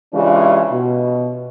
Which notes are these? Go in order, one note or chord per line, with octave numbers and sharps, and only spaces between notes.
C#3 E3 G#3 D4 F4 G4
B2